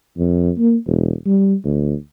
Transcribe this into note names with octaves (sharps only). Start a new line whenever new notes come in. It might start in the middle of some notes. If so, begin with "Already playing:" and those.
F2
A#3
E1
G3
D2